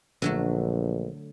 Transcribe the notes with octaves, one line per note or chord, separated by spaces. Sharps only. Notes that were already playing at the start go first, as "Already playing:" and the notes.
A#1 D3 F#3 A3